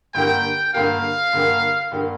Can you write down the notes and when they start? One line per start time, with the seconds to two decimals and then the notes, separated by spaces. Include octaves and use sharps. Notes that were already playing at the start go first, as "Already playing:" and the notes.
0.14 G2 D3 A#3 G4 A#4 G5
0.74 G2 D3 A#3 G4 A#4 F5
1.33 G2 D3 A#3 G4 A#4
1.91 G2 D3 A#3 G4 A#4